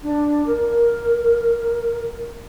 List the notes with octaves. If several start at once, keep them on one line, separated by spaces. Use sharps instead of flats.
D4
A#4